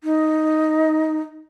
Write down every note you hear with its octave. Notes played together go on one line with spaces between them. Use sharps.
D#4